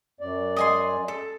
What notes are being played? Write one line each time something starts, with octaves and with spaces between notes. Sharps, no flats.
F#2 D5
D#5 G#5 C6
A4